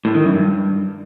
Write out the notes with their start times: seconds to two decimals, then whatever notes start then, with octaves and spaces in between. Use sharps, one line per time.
0.05 A2
0.14 D#3
0.24 F#2
0.34 G2